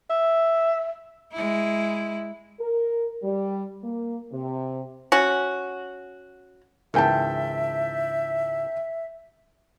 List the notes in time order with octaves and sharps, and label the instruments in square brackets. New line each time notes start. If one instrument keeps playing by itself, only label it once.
[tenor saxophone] E5
[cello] G#3 E4
[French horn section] A#4
G3
A#3
C3
[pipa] C#4 F#4
[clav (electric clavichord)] C#2 G#2 E3 [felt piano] A#4 G5 A5 [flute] E5